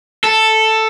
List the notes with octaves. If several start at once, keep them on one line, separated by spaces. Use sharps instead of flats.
A4